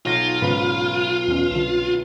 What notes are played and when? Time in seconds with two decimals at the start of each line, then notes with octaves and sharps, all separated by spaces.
0.05 B1 F4 A#6
0.42 G#2 C#3 B4
1.28 E2 C#4
1.51 C2 D3 E7